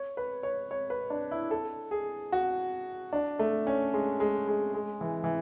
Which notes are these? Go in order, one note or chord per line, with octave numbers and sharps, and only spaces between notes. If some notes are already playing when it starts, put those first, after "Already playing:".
Already playing: C#5
B4
C#5
C#5
B4
D4
E4
A4
G#4
F#4
D4
A3
C#4
G#3
G#3
G#3
G#3
E3
E3